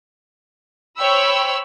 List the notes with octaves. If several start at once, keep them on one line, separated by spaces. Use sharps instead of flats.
C5 C#5 G5 B5 E6